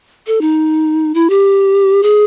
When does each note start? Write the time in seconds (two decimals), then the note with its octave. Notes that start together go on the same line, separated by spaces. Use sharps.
0.27 A4
0.41 D#4
1.14 E4
1.30 G4
2.03 G#4